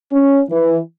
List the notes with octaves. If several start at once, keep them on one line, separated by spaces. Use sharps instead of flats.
C#4
E3